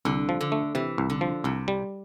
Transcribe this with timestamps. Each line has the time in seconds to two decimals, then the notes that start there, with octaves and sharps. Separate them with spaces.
0.05 C2 D3
0.29 F3
0.41 D3
0.52 A3
0.75 C3 E3
0.98 C2
1.10 D3
1.21 F3
1.44 C2 C3
1.68 G3